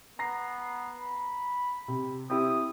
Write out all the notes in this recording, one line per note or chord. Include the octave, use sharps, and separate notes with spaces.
B3 A#5 A#6 C7
B5
C3
C4 E4 G4 D#6